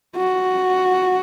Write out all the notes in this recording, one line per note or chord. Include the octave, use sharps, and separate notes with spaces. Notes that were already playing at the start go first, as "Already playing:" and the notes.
F#4